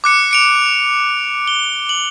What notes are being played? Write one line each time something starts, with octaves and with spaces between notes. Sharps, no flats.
D6 F#6 C#7
C#7 D7 F7
G7
F#7